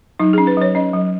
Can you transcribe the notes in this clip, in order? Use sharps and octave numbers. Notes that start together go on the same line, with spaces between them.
F#3 D#4
G#4
C#4
B4
F#3 C#5
C#4 D#5
F#3